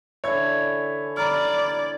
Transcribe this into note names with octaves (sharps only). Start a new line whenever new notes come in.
D3 E3 E4 C#5 G#6
D5 A#5 B5 F6